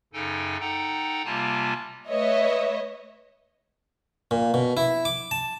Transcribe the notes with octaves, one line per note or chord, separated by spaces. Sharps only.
F#2 C#3 D#4 A4 G5 G#5
D#4 A4 F#5 G5 A#5
C3 G3 A#3 F4 G#5 A5
A3 B4 C#5 D#5 E5
A#2
B2
E4
D6
A5